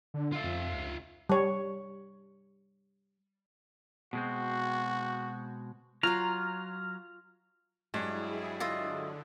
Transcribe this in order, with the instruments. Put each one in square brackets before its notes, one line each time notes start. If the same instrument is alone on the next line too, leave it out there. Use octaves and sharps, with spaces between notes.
[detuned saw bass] D3
[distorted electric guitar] F4 E5
[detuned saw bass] F2
C#2
[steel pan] G3 C#5
[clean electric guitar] B2 G#3 C4 [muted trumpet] F#4
[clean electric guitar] F#3 [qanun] F4 F5 [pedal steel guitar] A#5 [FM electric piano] F6
[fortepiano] G2 [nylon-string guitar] F#3 G#3 [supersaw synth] E4 G#4
[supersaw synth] D3 [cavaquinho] F4 D#5 E5